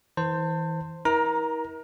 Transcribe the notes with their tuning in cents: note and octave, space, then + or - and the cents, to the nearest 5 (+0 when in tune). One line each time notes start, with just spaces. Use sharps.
E3 -35 C5 +0 A5 +30
E4 -45 A#4 +30 A#5 +5